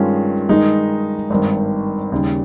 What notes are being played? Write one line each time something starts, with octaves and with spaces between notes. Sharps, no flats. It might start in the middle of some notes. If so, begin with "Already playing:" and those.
Already playing: G2 D#3 G#3 C#4 F4
G2 D#3 G#3 D#4
G#1 G2 D#3
D#2 C#3 G3